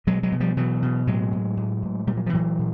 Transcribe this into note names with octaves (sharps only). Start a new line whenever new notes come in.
B2 F#3 G#3
F#3 G#3
B2
F3 G3
B2 E3 F#3
B2
A2 F#3 G#3
A2
A2
A2
A#2 G3
F#3
F3
A#2 E3 F#3
A#2